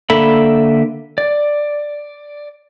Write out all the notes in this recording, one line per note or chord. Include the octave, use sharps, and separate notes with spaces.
D3 A#3 A4 E5 B5
D5